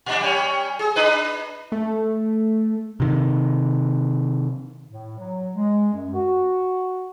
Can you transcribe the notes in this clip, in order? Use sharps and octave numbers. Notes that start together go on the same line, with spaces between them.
A#2 D4
G3 C#4
G#4
D4 B4
A3
C3 D#3
A2
F#3
G#3
F#2
F#4